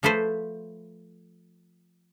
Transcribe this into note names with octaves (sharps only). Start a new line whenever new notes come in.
F3 A3 A4 B4 C5